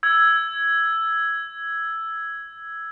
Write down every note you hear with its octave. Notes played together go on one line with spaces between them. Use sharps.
E6 G#6